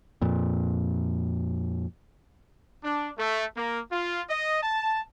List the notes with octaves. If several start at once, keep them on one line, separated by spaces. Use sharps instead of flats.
F2 A#2
D4
A3
A#3
F4
D#5
A5